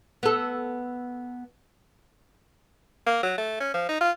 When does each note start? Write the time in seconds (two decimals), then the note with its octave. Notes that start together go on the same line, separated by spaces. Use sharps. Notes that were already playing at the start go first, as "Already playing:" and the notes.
0.23 B3 A4
3.07 A#3
3.23 F#3
3.38 A3
3.60 C#4
3.74 F3
3.89 D#4
4.01 F4